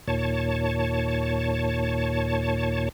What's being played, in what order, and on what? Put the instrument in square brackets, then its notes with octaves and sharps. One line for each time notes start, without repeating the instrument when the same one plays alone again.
[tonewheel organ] D#2 A#2 C#5 A5